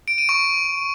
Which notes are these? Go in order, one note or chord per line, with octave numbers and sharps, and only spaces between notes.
D7
D#7
C#6